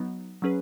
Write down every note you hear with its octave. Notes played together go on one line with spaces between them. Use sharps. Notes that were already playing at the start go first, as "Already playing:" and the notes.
Already playing: F#3 B3 D#4
F#3 C#4 G#4 B4